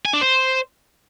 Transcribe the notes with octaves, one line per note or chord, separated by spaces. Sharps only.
G#5
D4
C5